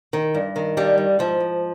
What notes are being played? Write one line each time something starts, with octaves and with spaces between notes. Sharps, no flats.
D#3
G2
D#3
G2 G3
G2
G#2 F3
G#2